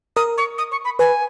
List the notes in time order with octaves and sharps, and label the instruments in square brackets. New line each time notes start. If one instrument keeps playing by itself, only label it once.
[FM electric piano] A#4 [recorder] D#6
[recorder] C#6
D#6
C#6
B5
[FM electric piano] B4 [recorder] G#5